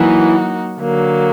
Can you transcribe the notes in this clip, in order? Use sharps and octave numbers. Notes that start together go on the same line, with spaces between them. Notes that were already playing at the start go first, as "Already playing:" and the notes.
Already playing: E3 F#3 A#3 D#4 F#4
D3 F#3 A#3